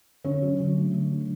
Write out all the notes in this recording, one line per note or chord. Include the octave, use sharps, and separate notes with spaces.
D3 C#4 C#5
F#3
D3
A3
D3
F#3